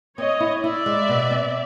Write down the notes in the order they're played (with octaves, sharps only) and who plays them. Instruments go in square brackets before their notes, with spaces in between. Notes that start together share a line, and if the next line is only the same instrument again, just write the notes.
[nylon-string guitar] C4 [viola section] C#5 D#5
[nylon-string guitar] E4
[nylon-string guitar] E4 [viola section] D5 E5
[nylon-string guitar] G#3
B2
C4